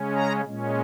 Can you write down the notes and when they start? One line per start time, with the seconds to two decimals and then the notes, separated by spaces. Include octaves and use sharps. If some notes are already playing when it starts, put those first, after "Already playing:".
Already playing: C#3 G#3 C#4
0.15 A#5
0.45 A#2 G#3 C#4